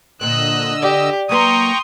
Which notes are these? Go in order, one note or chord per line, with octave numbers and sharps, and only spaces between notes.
A#2 D3 C4 D#5 E6 F#6
G4 D5
F#3 A#3 B4 G5 A#5 C6 C#6 D#6